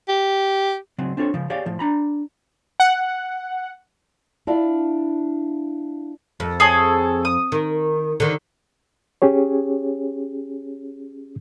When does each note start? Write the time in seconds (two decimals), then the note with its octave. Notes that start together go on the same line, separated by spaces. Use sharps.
0.09 G4
0.98 C#3 F#3 C4
1.17 C4 D4 F4 A4 C#5
1.34 C#3 F3
1.50 G4 G#4 C#5 D5 F5
1.66 A2 F3
1.79 D4 A#5 B5
2.80 F#5
4.47 D4 E4 F4 D5
6.40 F2
6.60 G#4 A4 C#5
7.25 D#6
7.52 D#3
8.20 D3 D#3
9.22 C#4 G4 G#4 C#5